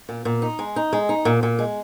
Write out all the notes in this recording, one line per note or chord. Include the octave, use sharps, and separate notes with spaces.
A#2
A#2
D#4
G#3
D#4
G#3
D#4
A#2
A#2
G#3